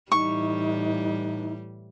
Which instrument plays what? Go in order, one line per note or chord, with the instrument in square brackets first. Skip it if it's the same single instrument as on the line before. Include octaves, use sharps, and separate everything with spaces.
[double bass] A2 E3 [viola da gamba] G3 [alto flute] D#4 [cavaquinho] C#6